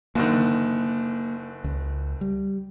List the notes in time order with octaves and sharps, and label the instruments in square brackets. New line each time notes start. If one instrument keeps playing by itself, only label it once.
[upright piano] F#1 D3 D#3 [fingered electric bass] A#3
[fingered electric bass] C#2
G3